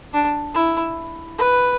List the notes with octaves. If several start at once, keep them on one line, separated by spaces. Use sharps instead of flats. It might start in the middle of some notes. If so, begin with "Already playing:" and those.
D4
E4
B4